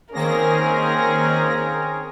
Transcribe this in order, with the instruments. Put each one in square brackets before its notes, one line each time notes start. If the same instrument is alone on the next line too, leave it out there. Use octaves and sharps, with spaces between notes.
[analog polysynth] D#3 A#3 A#6 [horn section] C4 C#4 G#4 [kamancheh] A#4